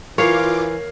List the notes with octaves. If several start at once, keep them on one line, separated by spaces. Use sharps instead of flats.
E3 F4 A#4 C#5 F5 D6 C7